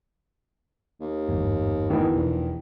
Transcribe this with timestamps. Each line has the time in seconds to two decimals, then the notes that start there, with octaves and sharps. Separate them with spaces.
1.00 D#2
1.29 G1 E2 G#2
1.90 B2 D#3 E3
2.14 E1 A#1